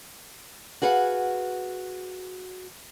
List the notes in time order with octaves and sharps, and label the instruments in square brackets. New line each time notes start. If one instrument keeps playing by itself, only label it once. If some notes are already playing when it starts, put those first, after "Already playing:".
[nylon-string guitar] F#4 G#4 B4 F5 F#5